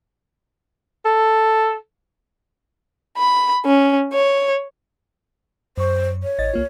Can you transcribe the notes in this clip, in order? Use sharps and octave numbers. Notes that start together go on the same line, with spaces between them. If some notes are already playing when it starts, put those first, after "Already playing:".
A4
B5
C#4
C#5
F#2 C5 C#6
C#5
A1 D#5 A6
C2 A#3 F4